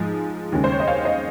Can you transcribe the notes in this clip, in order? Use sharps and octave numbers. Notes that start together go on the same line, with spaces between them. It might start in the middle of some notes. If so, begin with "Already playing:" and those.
Already playing: G#2 F3 G#3
D#2 C#3 G#3
C5
C#5
D#5
C#5 F5
C5 D#5